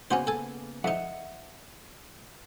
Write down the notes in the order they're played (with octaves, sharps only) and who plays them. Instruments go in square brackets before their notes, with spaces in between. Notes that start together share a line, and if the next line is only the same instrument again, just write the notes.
[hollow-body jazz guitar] C#3 A#3 B3 [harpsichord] C#4 F#4 C5
[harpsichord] A4 G#5
[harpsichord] F2 D#4 [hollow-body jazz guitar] E5 F#5